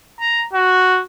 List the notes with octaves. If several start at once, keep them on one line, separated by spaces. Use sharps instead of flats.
A#5
F#4